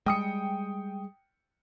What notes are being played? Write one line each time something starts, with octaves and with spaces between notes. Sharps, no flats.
G3 G#3 G5 D#6 C#7